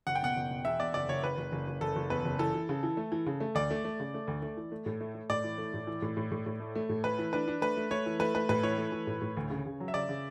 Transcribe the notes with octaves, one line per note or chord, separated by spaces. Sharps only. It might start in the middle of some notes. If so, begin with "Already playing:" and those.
F#1 F#5
G5
B2 F#5
F#1
B2
E2 E5
E2 D5
F#1 D5
F#1 C#5
F#1 B4
F#1
F#1
F#1
F#1 A4
F#1
E2 B4
F#1
E3 A4
E3
C#3
E3
A3
E3
C#3
A3
D2 D5
A3
A3
C#3
A3
D2
A3
E3
A3
A2
A3
A3
A2 D5
E3
A3
A2
E3
A2
A2
A2
A2
A3
A3
A2
A3 B4
E3
D4 B4
D4
A3 B4
A3
A3 C#5
E3
A3 B4
A3 B4
A2 B4
E3 C#5
A3
E3
A2
A2
D2
C#3
C#3
F#3
E5
C#3 D5
C#3